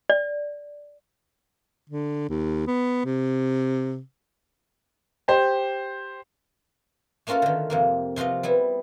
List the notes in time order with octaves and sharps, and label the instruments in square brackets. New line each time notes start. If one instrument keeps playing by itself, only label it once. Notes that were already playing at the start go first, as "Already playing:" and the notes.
[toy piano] D5
[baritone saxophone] D3
D#2
B3
C3
[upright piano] G4 C5
[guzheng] A3 A#3 C#4 F4 F#4 A4
D3 D#3
F2 C3 A#3
C3 F3 F4 F#4 D#5
G3 B3 E4